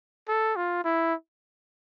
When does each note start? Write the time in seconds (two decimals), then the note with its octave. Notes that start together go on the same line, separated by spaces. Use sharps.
0.28 A4
0.56 F4
0.84 E4